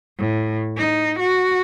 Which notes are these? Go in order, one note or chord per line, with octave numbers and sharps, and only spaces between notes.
A2
D#4
F#4